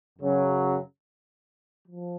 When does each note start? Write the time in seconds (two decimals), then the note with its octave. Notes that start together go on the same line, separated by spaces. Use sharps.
0.19 F#2 C#3 F#3 C#4
1.88 F3